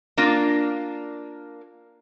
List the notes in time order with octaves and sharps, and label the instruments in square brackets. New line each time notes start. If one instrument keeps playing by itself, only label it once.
[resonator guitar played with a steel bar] A#3 D4 F4